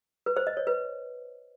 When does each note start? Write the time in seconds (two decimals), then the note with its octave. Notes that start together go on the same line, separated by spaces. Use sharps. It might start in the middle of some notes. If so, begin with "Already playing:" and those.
0.26 B4
0.37 C5
0.47 D#5
0.57 C#5
0.67 B4